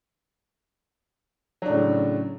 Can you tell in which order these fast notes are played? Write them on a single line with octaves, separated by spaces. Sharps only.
F#3 D4 A2 C#3